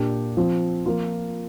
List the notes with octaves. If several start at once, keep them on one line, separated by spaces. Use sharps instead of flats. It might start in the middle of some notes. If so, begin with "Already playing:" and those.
Already playing: A#2 A#3 D4 G4
F3 C4 F4
F3 A#3 F4